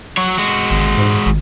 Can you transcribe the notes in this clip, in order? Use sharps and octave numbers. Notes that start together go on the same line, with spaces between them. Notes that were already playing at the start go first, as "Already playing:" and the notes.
F#3 C#5
G#3 F#4
G#1
G#2
G#1